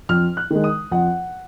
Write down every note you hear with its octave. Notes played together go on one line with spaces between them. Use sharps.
F2 F6
F#6
D#3 G#3
D#6
F2 F#5